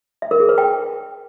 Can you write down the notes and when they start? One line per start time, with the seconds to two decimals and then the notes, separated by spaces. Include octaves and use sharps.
0.22 E5
0.31 A#4
0.40 G#4
0.49 B4
0.58 G5